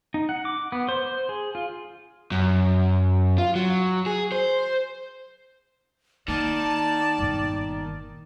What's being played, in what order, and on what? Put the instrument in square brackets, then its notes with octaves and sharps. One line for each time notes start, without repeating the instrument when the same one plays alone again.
[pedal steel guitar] D#4
F#5
D6
B3
C5
C5
G#4
F4
[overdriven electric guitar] F#2
F4
F#3
G#4
C5
[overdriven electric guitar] D#3 [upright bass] A#3 [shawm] D5 [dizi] A5
[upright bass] G1 A#2